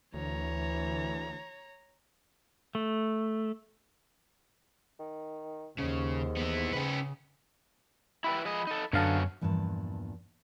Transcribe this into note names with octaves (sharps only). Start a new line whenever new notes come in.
D2 E3 C#5 A#5
A3
D#3
D#2 G#2 C#3
E3 B3
C#3 C#4 B4
E4 G4 B4 B5
F3 G#4 D#5
D#4 A4
F#2 D3 F#3 B3 C#4 F5 A5
E2 G2 A#2 F3 B4 A5